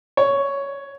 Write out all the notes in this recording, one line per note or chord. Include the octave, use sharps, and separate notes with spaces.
C#5